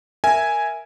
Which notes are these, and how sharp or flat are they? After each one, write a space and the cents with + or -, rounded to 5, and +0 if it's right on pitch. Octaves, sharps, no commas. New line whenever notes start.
A#4 +0 E5 +0 G#5 +0